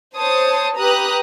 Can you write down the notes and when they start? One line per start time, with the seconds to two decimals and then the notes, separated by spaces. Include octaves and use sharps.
0.17 C5 C#5 A5 D#6
0.77 G4 B4 A#5 D#6 F#6